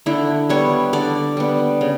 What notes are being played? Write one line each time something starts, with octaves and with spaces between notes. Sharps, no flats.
D3 E4
G3 B3 C#5
D3 D5
G3 B3
C#3